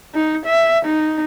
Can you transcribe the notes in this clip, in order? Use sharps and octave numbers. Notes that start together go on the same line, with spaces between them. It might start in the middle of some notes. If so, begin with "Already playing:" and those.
D#4
E5
D#4